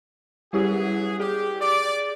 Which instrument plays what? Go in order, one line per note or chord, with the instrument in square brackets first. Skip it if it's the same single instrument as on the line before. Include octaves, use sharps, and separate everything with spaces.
[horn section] F#3 B3 G#4 [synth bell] G3 E4 G4
[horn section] G4 [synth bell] G#4
[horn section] D5